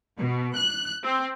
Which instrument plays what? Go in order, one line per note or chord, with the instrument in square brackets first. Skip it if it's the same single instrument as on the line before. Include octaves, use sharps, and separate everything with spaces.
[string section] B2
F#6
C4